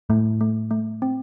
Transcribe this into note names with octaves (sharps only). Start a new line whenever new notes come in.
A2 A3
A3
A3
C4